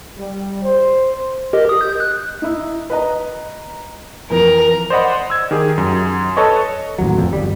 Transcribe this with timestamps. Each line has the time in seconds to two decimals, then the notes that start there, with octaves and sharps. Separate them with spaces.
0.18 G3
0.62 C5
1.53 G4 A#4 D#5
1.69 D#6
1.81 G6
2.00 F#6
2.42 D#4 E4
2.90 B4 D#5 A#5
4.30 F2 E3 A#4
4.90 C5 D5 D#5 F#5 B5
5.30 E6 G#6
5.51 D#3 G4 G#4
5.78 F#2
6.36 A4 B4 C#5 D#5 C#6
6.98 A1 D#2 F#3
7.18 F2
7.33 G1 G3